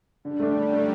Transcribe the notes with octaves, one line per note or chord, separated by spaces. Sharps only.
D3 G3
A3 D4
D3 F#3
A3 D4